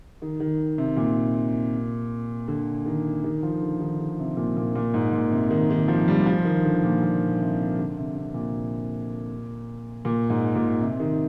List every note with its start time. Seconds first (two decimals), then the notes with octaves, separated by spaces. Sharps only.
0.22 D#3
0.40 D#3
0.78 C3
0.97 A#2
2.48 D3
2.86 D#3
3.24 D#3
3.43 F3
3.62 D3
3.80 D#3
3.99 D3
4.19 C3
4.37 A#2
4.57 A#2
4.75 A#2
4.94 G#2
5.13 A#2
5.32 C3
5.50 D#3
5.70 D#3
5.88 F3
6.08 G3
6.26 F3
6.45 D#3
6.65 D3
6.83 A#2
7.03 A#2
7.41 C3
7.78 D3
7.97 C3
8.16 C3
8.34 A#2
10.05 A#2
10.30 G#2
10.55 A#2
10.81 C3
11.00 D#3